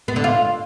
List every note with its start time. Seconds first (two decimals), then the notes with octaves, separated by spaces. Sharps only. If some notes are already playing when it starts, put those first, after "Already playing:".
0.08 B3
0.16 D3
0.24 F4